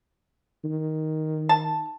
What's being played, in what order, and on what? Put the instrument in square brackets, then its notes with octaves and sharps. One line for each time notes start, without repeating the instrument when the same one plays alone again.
[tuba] D#3
[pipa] A5